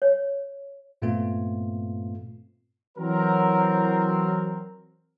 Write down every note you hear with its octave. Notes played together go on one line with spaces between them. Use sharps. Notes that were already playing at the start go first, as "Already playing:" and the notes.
C#5
G2 A#2 A3 B3 C4 F4
E3 F#3 C4 A#4